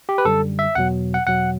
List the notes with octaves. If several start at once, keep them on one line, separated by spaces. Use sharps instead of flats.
G4
B4
F#2 D3 G3 A4
E5
E2 B2 F#3 F#5
F#5
E2 B2 F#3 F#5